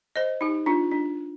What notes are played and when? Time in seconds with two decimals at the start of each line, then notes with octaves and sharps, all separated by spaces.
0.16 C5 D#5
0.41 D#4 G4
0.66 D4 F4
0.91 D4